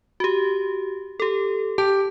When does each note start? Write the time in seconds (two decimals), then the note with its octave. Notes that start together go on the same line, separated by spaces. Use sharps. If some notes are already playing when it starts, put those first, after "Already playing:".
0.20 F#4 G4
1.20 G4 A4
1.78 G4 A5